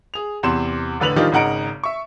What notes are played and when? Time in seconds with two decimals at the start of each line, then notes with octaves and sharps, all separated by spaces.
0.14 G#4 F7
0.43 E2 C3 C6 E7
1.00 A1 D3 B4 F7 F#7
1.16 D#3 F3 G3 D4 D#4 F4
1.32 G#1 C#3 D#4 F#5 A#5 D7
1.84 E5 C#6